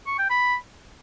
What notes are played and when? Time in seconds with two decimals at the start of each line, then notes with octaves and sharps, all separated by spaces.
0.07 C#6
0.18 G5
0.30 B5